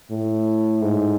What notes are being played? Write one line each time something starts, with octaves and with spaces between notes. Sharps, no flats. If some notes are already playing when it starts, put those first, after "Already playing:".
A2
G#2